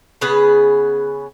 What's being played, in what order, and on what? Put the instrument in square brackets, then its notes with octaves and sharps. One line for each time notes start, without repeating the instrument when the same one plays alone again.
[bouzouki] C#3 B3 G#4 B4